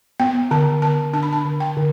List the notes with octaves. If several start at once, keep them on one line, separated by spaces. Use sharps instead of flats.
B3 G5
D3 A5
D3 A5
D4 A5
B5
A5
D3
G5
D3